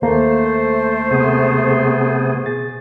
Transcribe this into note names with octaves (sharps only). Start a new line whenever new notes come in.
D#2 A3 A#3 A4 C5
C3 B3 G#4
B2 G#4 A6